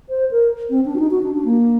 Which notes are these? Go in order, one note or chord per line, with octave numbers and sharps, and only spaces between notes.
C5
A#4
C4
D4
F#4
D#4
F#4
D4
D4
A#3